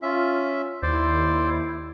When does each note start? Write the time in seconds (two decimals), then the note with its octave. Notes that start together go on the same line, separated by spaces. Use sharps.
0.02 C#4 F4 E5
0.82 D#2 E4 C5 D5